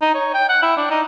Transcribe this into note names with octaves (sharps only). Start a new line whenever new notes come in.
D#4
C#5
G5
F#5
E4
D4
D#4